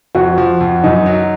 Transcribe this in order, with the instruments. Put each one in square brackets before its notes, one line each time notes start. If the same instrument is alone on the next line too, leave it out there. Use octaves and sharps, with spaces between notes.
[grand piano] F2 [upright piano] F#4
[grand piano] F3
F2
[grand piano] F#2 [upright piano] D#4
[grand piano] F#3